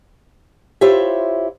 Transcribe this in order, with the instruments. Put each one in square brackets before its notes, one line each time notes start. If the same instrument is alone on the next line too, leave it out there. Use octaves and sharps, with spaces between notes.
[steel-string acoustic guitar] E4 F4 G4 C5 C#5 E5